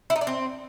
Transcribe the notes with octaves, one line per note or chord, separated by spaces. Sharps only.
E4
D#4
D4
C4